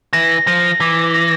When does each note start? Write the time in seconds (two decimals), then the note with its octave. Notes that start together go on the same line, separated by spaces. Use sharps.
0.13 E3 A#6
0.47 F3 A#6
0.80 E3 D6
1.14 A#6